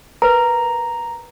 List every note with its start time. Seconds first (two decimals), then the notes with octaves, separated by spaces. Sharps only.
0.22 A#4 B4 A#5